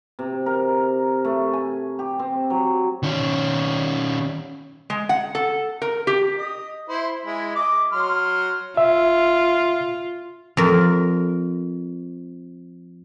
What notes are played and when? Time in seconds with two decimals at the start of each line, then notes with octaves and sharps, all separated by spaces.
0.19 C3
0.46 A#4
1.25 A3
1.53 G#5
1.99 G4
2.19 C4
2.50 F#3
3.03 D#3 C#4
4.90 G#3
5.09 F#5
5.35 A4
5.82 A#4
6.07 G4
6.38 D#5
6.89 E4 C5
7.26 G#3 E4
7.55 D#5 D6
7.92 F#3 C6 F6
8.77 F4 E5
10.57 F2 A#4